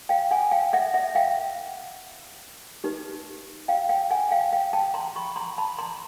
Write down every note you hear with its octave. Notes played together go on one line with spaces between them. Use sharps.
F5 G5
F#5 G#5
F5 G5
E5 F#5
E5 F#5
F5 G5
D#4 G4 B4
F5 G5
F5 G5
F#5 G#5
F5 G5
F5 G5
G5 A5
A#5 C6
B5 C#6
A#5 C6
A5 B5
A#5 C6